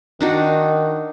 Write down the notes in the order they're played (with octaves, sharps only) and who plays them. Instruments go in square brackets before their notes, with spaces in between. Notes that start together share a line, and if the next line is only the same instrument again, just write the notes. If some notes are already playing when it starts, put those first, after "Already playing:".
[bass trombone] D#3 [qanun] D4 D#4 F#4